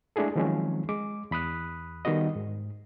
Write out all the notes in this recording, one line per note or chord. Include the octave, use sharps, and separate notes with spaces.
G#3 A3 D4 E4 G#4 A4
D#3 F3 F#3 G#3 C4 C#4
G#3 D6
E2 B5 D#6 F#6
D#3 G3 B3 F#4 D#5
G#2